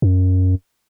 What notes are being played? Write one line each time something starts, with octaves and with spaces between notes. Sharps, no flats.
F#2